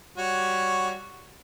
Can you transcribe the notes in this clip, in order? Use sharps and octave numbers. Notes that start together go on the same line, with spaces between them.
G3 F#4 C#5